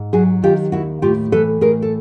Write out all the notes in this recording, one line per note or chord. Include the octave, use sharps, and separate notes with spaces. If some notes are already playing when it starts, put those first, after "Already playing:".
Already playing: G#2
F#3 F#4 G#4
D#3 F4 G4
D#2 E4 F#4
A2 F4 G4
E3 A4 B4
A2 G#4 A#4
A4